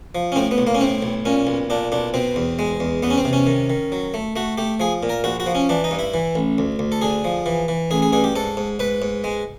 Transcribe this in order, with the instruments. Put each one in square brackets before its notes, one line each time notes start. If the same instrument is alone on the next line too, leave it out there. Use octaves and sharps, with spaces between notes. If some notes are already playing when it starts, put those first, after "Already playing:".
[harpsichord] F3
C#4
A2 C4
B3
B1
A#3
C#4
A2 C4
B1
A#2 C#4
B1
A#2 D4
B1 D4
B2 C4
E2
G#3
E2
E2 B3
C#4
C4
C3
C#4
D#3
D#3
F#3
A3
A3 F#4
A3 G4
F3 G#4
A#2
A#4
A#1 F#4
F#4
F3
C#4
E3 D4
D#4
G2
E4
E3
A1
D2
D2
A4
D3 G#4
F3
E3
E3
A1 G#4
G#4
G2 G#4
G4
G#2 A4
G#2
G#2 B4
G#2
G#3